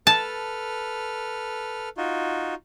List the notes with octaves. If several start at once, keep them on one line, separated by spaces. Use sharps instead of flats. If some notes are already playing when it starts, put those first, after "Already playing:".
A4 B4 A5 F6
D#4 F4 F#4